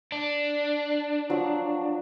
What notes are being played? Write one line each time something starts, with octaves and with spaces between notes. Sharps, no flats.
D4
F3 F#3 F#4